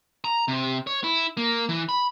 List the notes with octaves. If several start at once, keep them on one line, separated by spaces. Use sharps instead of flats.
A#5
C3
C#5
E4
A#3
E3
B5